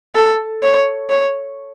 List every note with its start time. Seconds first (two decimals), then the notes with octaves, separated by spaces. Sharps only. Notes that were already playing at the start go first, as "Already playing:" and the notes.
0.15 A4
0.62 C#5
1.09 C#5